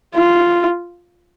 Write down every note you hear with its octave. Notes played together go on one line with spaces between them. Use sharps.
F4